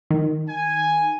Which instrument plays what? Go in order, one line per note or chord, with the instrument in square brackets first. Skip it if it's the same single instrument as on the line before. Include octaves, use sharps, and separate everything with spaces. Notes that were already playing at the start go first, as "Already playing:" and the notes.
[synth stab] D#3
[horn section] G#5